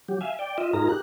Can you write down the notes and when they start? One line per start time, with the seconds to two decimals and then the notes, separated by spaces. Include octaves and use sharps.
0.08 F#3 G4
0.21 E5 F5 G#5
0.39 D5 G5
0.58 F4 D#5 E5
0.73 G#2 D#4 F4 G#4 A#4 A#5
0.89 G4 F#6